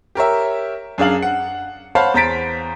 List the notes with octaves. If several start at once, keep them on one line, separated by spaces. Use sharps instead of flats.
G4 A#4 C#5 E5
F#2 D4 G#4 F5 F#7
F#5
C5 C#5 F5 F#5 A5 B5
E2 C5 A#5 A6 B6 D7